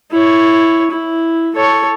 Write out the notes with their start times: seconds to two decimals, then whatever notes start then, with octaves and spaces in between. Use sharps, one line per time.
0.11 E4 C#5
0.91 E4
1.55 A4 C#5